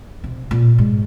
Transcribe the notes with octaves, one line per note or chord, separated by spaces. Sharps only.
C3
A#2
G#2